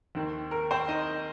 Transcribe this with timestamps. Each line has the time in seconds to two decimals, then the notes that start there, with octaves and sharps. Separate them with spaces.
0.15 D#2 D#3 C4
0.51 A#4
0.71 C4 C5
0.88 D#4 D#5